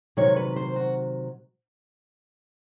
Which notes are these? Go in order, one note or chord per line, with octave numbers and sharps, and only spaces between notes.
C3 D#3 F#3 C#5
B4
C5
F#4